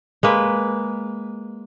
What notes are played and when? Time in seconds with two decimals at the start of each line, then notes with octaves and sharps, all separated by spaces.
0.23 G#3 A#3 B4